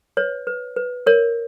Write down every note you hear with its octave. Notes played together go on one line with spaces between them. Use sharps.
B4 C#5
B4
B4
A#4 C#5